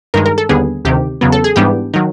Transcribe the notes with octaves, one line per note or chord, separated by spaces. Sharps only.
G2 D#3 G#3 A#4
A#4
A4
D#2 D3 G3 B3 G#4
D2 C3 D#3 G4
E2 C#3 F#3 B3
A4
G#4
G#2 E3 G3 B3 D4 G4
D#3 F#3